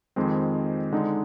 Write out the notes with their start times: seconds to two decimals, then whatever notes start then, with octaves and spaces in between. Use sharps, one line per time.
0.16 F2 D#3 G#3 C4
0.93 D3 G#3 D#4